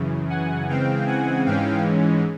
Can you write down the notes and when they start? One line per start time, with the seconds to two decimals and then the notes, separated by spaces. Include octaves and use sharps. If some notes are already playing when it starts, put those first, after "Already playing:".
Already playing: F#2 C#3 E3
0.30 F#5 G#5
0.68 C#3 E3 G#3 C4 F5 G5
1.07 F#5 G#5
1.45 G#2 E3 G#3 C#4 F5 G5